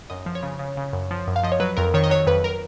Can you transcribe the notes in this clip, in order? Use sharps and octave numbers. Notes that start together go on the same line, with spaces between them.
F#2 D#5
F3
C#5
C#3
C#3
C#3
F#2
F3
F#2
F5
F3 D#5
C#5
F#3 B4
F2 A#4
D#3 C#5
D#5
F#3 C#5
F2 B4
A#4